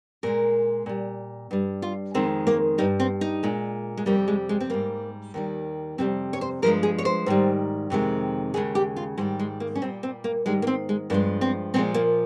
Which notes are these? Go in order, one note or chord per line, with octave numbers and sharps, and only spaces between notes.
A#2 G#3 A#4
A#2 G3
G2 G3
F4
F2 D#3 G#3 C4
A#3
G2 G3 D#4
C4
D#4
A#2 G#3
G#3
F2 C3 G3 A#3
G#3
G#3
C4
G#2 G3 A#3
D#2 D#3 G3
F2 C3 G3 C4
C#5
C5
G2 F3 G#3 A#4
G#4
C#5
C5
G#2 D#3 G3
F2 C3 D#3 G#3
D#2 C#3 G#3 G#4
G4
F4
G#2 D#3 G3 G#3
G#3
A#3
C#4
A#2 G3 C4
C4
A#3
G#2 D#3 G3 G#3
A#3
C4
G#3
G2 F3 G#3 A#3
C4
A#2 F3 G#3 C4
A#3